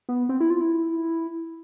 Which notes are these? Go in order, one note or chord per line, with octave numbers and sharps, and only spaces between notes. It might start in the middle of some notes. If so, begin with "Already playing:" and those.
B3
C4
E4
F4
E4